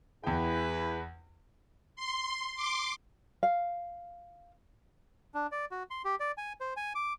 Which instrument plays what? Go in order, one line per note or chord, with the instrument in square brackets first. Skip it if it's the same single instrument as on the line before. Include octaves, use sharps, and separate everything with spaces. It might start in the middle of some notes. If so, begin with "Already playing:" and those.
[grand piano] E2 G5 [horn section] E4 G#4 B4
[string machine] C6
C6 D6
[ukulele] F5
[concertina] D4
D5
F#4
C6
G4
D5
G#5
C5
G#5
D6